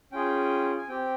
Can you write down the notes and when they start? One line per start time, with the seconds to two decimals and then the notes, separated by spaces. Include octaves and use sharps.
0.12 C#4 F4 G#4 G5
0.78 G#5
0.88 C4 G4 G5